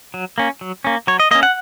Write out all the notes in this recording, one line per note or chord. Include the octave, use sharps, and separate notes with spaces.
F#3
A#3 C#4
F#3
A#3 C#4
F#3 C#5
D#5
A#3 C#4 D#5
F#5